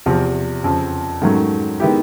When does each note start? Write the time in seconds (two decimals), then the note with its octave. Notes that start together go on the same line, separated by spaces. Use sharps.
0.06 E2 C3 F3
0.64 F2 C#3 F3
1.22 G#2 D#3 F#3 A3 C#4
1.80 D#3 G#3 B3 E4 G4